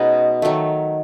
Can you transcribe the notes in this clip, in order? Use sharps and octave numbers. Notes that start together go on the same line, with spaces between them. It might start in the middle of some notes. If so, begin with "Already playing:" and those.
Already playing: B2 G#3 B3 C#4 D#4 C#5 D#5
D#3 F#3 A3